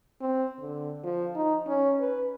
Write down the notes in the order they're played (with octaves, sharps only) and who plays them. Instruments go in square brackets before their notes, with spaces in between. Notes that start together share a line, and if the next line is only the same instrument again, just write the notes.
[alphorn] C4
D3
F3
D#4
C#4
B4